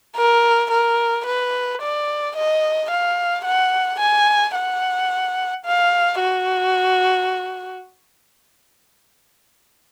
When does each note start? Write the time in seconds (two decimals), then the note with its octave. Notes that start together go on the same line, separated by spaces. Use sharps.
0.16 A#4
0.71 A#4
1.26 B4
1.81 D5
2.36 D#5
2.90 F5
3.45 F#5
4.00 G#5
4.55 F#5
5.65 F5
6.20 F#4